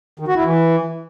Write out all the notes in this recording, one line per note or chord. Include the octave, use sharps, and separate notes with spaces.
D#3
F#4
E4
E3